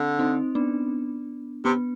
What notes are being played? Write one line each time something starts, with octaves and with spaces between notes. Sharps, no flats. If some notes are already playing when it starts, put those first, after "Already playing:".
Already playing: D3 C4
C4 D#4
B3 D4
C3 B3